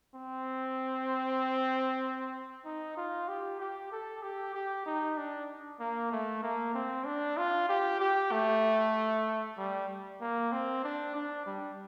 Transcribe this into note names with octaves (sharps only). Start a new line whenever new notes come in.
C4
D#4
F4
G4
G4
A4
G4
G4
D#4
D4
A#3
A3
A#3
C4
D4
F4
G4
G4
A3
G3
A#3
C4
D4
D4
G3